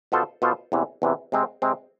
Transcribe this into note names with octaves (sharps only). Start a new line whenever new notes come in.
B2 B3 F4 A4 C5
B2 B3 F4 A4 C5
E2 C3 E3
E2 C3 E3
C3 G#3 C4
C3 G#3 C4